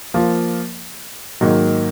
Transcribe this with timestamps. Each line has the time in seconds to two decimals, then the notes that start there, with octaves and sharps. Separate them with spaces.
0.14 F3 A#3 F4
1.41 G#2 D#3 F#3 A#3